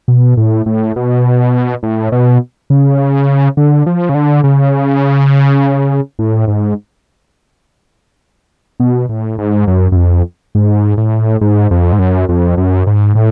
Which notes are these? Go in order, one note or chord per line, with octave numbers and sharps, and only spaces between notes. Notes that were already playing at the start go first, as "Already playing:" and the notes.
B2
A2
A2
B2
A2
B2
C#3
D3
F3
C#3
D3
C#3
A2
G#2
B2
A2
G#2
F#2
F#2
F2
G#2
A2
G#2
F2
G#2
F#2
F2
F#2
G#2
A2